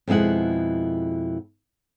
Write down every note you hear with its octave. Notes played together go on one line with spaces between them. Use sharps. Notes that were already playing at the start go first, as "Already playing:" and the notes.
F2 B2 G#3 E4 F#5